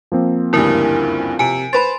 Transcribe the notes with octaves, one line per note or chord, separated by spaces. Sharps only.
F3 A#3 C4
F#1 D2 G2 E4 A#4
C3 G#5 D7
B4 C5 B5 C6 A6